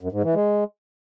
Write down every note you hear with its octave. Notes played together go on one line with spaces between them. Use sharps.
F#2
G#2
E3
G#3